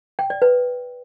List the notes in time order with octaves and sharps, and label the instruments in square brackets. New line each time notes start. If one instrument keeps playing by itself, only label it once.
[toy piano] G5
D5
B4